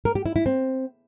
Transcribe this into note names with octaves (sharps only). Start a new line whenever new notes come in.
A#4
G4
E4
E4
C4